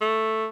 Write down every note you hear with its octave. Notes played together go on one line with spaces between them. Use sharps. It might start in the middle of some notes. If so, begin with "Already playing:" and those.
A3